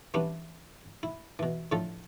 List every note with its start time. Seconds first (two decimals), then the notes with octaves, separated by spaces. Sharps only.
0.14 E3 G3 B3 C#4 D4
1.03 E4
1.39 B2 E3
1.72 A2 D3 F3 F4 A4